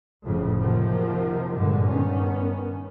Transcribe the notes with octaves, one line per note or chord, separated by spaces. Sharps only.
F1 F2 A2 C#3
C3 D#3 F3 F#3 A#3
G2 A#2 D3 G#3
G2 D#3 B3 C#4